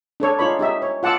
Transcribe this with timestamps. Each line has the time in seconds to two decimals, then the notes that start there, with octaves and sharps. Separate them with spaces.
0.20 D4 A4 C#5
0.39 D#4 F4 C#5 B5
0.59 D#4 G4 E5
0.82 C#5
1.03 F4 F#5 A5 D6 E6